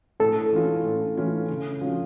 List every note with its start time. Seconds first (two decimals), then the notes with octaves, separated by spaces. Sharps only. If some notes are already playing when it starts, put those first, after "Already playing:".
0.20 A2 A4
0.53 E3 A3 C#4 F4
0.85 A2
1.17 E3 A3 C#4 F4
1.49 C#3
1.81 F3 C#4 F4